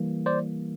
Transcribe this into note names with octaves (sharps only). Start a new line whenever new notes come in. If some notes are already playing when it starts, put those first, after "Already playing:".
Already playing: E3 G3 A#3
C5 D5